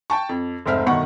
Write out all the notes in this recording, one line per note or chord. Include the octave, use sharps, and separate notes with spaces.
G5 A5 C#6
F2
F1 G#2 C4 E5 F6
G1 B2 D#3 F#5 C#6